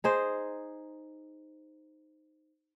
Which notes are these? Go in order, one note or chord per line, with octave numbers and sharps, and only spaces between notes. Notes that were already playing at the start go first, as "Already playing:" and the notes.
D#4 G#4 C5